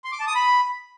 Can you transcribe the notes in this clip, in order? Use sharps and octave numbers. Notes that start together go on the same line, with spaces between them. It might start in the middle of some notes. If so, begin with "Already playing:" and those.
C6
D6
A5
D#6
B5